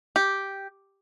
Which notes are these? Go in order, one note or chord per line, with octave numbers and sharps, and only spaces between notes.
G4